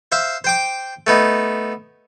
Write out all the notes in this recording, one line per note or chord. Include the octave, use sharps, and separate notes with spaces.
C5 E5 F5
C5 G5 D6
A3 B3 D#4